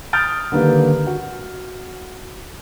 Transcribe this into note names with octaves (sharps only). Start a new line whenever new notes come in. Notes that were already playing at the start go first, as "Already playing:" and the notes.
D#6 F6 G6 A6 D7
D3 D#3 G3 A#3 B4
F#4